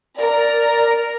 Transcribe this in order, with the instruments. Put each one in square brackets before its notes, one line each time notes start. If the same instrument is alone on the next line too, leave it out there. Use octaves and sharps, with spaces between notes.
[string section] A#4 [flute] D5